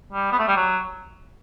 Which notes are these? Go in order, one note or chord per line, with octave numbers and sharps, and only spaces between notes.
G3
B3
A3
G3
F#3